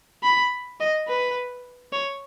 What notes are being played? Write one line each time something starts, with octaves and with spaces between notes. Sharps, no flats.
B5
D#5
B4
C#5